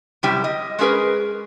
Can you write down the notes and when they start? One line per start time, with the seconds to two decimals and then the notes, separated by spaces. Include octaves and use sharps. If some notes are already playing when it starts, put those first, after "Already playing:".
0.23 F#2 C3 G3 E4 G4
0.44 D#5
0.79 G#3 A3 C#4 G#4 A#4 B4